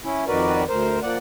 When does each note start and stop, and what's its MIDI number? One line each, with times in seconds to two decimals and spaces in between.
0.04 0.25 61
0.04 0.25 64
0.28 0.64 41
0.28 0.64 51
0.28 0.64 66
0.28 0.64 70
0.28 0.64 71
0.28 0.64 74
0.69 1.00 38
0.69 1.00 70
0.69 1.00 72
1.03 1.18 53
1.03 1.18 58
1.03 1.18 74
1.03 1.18 78